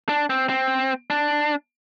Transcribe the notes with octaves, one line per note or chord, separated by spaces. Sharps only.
D4
C4
C4
D4